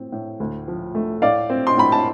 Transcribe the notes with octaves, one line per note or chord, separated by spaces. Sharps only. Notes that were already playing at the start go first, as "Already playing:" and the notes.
Already playing: A2 C4
A2
D2
F3
A3
A2 D5 F5
C4
C6
A2 B5
A5